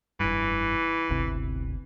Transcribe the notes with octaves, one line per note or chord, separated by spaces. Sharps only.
F1 G2 E3
D1 G1 C3